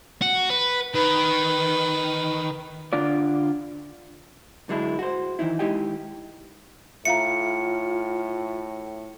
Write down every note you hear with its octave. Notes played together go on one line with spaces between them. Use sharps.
F#4
B4
D#3 B4
D3 D4 F4 D5
D3 F#3 G#3 D4 E4
F#4 C5
D#3 E3 D#4 E4
G#3 D#4 E4 G4 D#5 G5
A2 F4 E5 F5 A#5 C#7